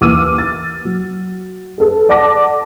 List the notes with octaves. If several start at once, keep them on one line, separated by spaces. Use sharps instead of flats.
D#2 E3 D6 E6 F6 D#7
A6
F#3
G#4 A4 B4
D5 F#5 A5 D6 A#6